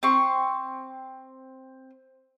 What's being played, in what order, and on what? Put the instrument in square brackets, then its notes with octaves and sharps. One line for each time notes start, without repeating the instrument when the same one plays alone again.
[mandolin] C4 C6 C#6